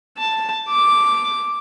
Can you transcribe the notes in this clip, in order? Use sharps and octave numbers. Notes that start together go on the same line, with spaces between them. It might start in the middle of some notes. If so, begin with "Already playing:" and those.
A5
D6